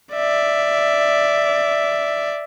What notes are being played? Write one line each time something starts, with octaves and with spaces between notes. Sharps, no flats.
D5 E5